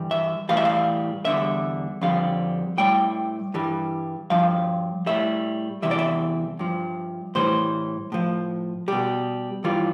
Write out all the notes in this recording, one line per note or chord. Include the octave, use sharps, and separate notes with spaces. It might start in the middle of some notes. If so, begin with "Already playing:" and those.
Already playing: G2 E3 G3
E5
A2 E3 G3 F5
E5
F5
E2 D3 G3 E5
F2 D3 G3 F5
A2 G3 G5
G2 E3 G3
G2 F3 F5
A2 G3 E5
E2 C3 E3 G3 E5
D5
E5
G2 F3
A2 E3 G3 C5
A2 F3
B2 G3 G4
G2 E3 G3 F4